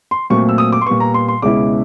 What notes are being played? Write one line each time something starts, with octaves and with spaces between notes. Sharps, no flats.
C6
A#2 F#3 A3 C4 C#6
E6
D#6
D6
C6
A#2 G3 B3 C#6
A#5
C6
C6
C#2 B2 G#3 C#4 E4 D6